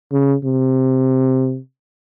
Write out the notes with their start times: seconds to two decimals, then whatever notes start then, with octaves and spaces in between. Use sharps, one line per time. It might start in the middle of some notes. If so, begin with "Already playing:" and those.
0.12 C#3
0.45 C3